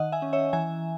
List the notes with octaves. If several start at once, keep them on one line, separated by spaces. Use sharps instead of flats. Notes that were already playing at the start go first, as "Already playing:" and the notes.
Already playing: D#3 D#5 F#5
E5 G#5
C#4
C#5 E5
E3 E5 G#5